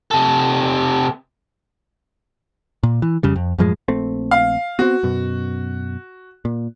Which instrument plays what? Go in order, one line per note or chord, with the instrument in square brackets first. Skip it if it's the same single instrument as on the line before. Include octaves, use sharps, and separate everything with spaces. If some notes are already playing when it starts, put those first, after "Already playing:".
[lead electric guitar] C3 A4
[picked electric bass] A#2
E3
F2 C#3 G3
F2
F#2 A2 F3 G#3
A#1 A3 C4
[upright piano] F5
[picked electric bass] B3 C4 [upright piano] F#4
[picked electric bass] F#2 B2
A#2